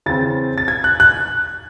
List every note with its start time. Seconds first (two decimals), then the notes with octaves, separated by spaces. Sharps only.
0.06 C#3 E3 C4 A6
0.58 A6
0.68 G#6
0.84 F#6
1.00 F#6